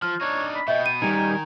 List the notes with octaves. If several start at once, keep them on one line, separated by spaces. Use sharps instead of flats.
F3 F6
D4 D#4 C#5
B5
B2 B3 D#5 E5 G5
D#7
D#3 G3 D#4 A#4 G#5